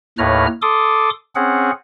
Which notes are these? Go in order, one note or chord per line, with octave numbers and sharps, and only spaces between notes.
D#2 A2 B4 C#5 A#5 F6
A4 C6 D6 D#6
C4 C#4 G#4 F#5